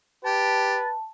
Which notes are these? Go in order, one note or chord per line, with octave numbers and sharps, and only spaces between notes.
G4 B4 A5 A6